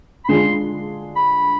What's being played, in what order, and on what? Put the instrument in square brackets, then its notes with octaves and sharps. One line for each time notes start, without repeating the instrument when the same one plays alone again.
[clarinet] B5
[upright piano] D3 G#3 D4 F4 G#4 [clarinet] C6
[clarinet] B5